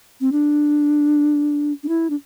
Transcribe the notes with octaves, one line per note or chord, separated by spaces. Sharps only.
C4
D4
D4
E4
D4